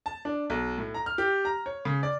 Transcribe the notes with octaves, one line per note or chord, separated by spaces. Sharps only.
A5
D4
B1
A2
A#5
F6
G4
A#5
C#5
C#3
D5